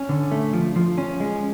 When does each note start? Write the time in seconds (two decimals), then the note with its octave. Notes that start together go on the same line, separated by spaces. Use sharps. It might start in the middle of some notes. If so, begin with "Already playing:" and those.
Already playing: C#4
0.09 D3
0.31 A3
0.53 F3
0.76 F3
0.98 C#4
1.20 G#3